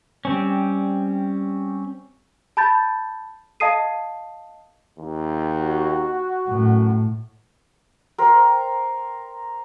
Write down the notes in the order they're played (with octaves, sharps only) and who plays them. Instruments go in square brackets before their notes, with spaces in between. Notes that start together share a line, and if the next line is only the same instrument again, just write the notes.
[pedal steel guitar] G3 C4 C#4
[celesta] A5 B5 G6 A6
D#5 F5 A5 D#6 C7 D#7
[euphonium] D#2
[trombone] F#4
[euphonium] F#2 [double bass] A2
[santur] A#4 C5 G5